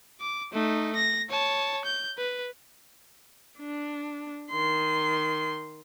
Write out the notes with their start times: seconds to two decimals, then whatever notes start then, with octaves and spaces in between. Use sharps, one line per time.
0.21 D6
0.53 A3 D#4
0.95 A#6
1.30 C#5 A5
1.85 G6
2.18 B4
3.58 D4
4.51 D#3 C6